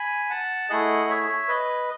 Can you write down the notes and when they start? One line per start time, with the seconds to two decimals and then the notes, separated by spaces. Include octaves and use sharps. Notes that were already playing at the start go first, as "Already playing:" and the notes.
Already playing: G#5 B5
0.30 F#5 A5
0.70 A3 E4 G#4 D#5 F#5
1.09 C#5 E5
1.48 B4 D#5